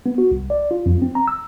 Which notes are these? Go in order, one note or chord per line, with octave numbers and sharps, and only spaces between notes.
B3
F#4
C2
D5
F4
F2
C4
A#5
E6